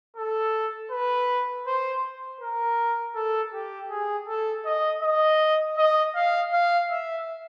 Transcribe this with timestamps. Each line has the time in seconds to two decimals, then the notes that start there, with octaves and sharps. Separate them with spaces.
0.16 A4
0.91 B4
1.66 C5
2.41 A#4
3.15 A4
3.53 G4
3.91 G#4
4.28 A4
4.66 D#5
5.03 D#5
5.78 D#5
6.15 F5
6.53 F5
6.90 E5